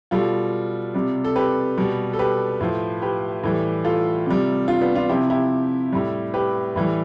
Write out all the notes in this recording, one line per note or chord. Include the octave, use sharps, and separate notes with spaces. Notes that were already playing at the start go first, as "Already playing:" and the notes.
B2 G3 F4 A4
C3 G3
A4
G4 B4
B2 G3
A4
G4 B4
A2 F3
G4 B4
A2 E3 G3
F4 A4
C3 G3
D4 F4
B3 D4
D4 F4
C3 F3 E4 G4
E4 G4
A2 G3
G4 B4
A2 E3 G3